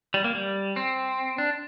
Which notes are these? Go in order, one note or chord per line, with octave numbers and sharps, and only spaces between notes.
G3
A#3
G3
C4
D4